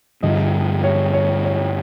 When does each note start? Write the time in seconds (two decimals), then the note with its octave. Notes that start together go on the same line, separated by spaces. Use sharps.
0.22 G2 D3 F3 D#5
0.83 C#5
1.13 C#5
1.44 C#5